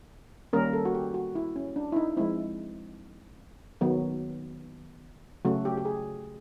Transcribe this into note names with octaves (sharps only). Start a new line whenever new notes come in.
D#3 G3 A#3 C#4 A#4
A4
F#4
G4
F#4
E4
C#4
D4
E4
D#4
F3 G#3 C4 E4
D#3 F#3 B3
C#3 F#3 A3 C#4 F#4
G4
G4
G#4